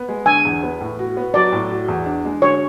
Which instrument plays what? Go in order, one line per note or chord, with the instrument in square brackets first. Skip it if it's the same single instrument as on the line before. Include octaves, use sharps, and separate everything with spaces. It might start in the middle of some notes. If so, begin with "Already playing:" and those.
Already playing: [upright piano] B3
G#3
[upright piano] D3 [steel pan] G#5
[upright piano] E2
B3
A2
F#4
B3
[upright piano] F#3 [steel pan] D5
[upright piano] A2
F#4
E2
D4
G#3
[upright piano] D3 [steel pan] C#5